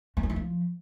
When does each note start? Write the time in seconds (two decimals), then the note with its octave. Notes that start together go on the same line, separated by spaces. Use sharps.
0.17 A3
0.23 F#3
0.30 E3
0.36 F3